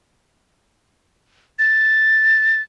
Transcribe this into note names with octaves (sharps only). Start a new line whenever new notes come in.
A6